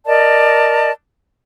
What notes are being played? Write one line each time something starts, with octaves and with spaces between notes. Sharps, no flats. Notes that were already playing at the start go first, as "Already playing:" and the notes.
A#4 D5 D#5 A5